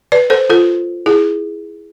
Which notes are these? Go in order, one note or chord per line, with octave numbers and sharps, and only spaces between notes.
B4 D5
A4 C5
F4 A4
E4 G#4